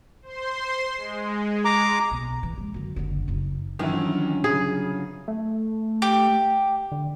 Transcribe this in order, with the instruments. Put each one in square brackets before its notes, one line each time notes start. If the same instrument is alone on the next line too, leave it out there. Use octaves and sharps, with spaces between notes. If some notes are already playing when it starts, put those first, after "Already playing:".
[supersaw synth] C5 C6
G#3
[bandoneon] A#5 D6
[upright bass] B1
E3
G#3
F#2 D3
F#1 D3
F#1 D#4
[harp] G1 F#3 E5 [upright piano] D#3 E3 [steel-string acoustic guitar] C#4
[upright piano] C#3 [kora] G#4
[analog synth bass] A3
[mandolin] G4
[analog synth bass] D3